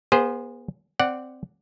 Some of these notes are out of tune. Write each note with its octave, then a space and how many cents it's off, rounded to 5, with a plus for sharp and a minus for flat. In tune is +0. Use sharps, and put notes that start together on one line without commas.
B3 -40 G#4 -20 C5 +0
C4 -10 D5 +0 F#5 +0